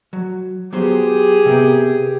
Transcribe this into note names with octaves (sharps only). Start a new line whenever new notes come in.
F#3
F#3 B3 G4 G#4 C5
C3 B3 A#4